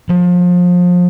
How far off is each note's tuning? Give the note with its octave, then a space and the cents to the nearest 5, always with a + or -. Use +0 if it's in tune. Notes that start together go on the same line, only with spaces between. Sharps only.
F3 +30